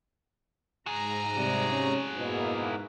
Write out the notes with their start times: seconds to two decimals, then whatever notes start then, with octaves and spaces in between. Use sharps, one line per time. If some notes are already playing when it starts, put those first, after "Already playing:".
0.86 G#2 F#4 G#4 A#5
1.36 C3 G3
1.70 C#4
2.16 G#2 B2 A#3 E4